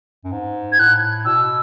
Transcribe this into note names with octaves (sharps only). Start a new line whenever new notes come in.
F#2
G#2
G#6
A2 F#6
B2 E6